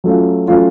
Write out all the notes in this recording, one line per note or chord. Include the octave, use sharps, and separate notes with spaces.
F#3 A3 C#4 F4
F#3 A3 C#4 F4